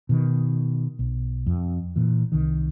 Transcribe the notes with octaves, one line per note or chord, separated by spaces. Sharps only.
B2 D#3
B1
F2
A#2 E3
C2 D#3